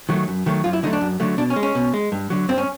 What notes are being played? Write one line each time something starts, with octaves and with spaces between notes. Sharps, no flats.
D#3 F#3 A3
F#2
D#3 F#3 A3
F#2 F4
E4
D3 F#3 A3 D#4
D4
F#2
D3 F#3 A3
B2 D4
C#4
G#3
C#4
B2
G#3
G2
D3 F#3
G2 C4
C#4